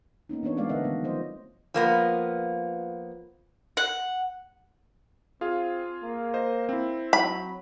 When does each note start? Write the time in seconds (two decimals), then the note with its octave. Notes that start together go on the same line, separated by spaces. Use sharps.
0.29 A#3 B3 C#4 D#4
0.43 E3 B3 D4 C#5
0.57 G#3 A3 C4 D4 D5 F5
0.69 D3 A#4 B4 D#5 E5 F#5
0.84 D#3 E3 G3 A3 B3
1.04 F3 C5 D#5
1.74 F3 A#3 B3
3.77 F#5
5.41 C4 F4 G#4 F5
6.03 A#3
6.34 A#4 C5 D#5
6.69 C4 E4
7.13 F#3 B5